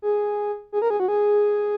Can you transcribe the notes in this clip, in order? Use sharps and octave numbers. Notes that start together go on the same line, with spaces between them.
G#4
G#4
A#4
G#4
F#4
G#4